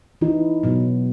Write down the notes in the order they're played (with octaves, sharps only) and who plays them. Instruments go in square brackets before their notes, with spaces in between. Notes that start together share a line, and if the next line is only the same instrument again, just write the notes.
[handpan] E3 [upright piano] D#4
[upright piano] B2 [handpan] F#3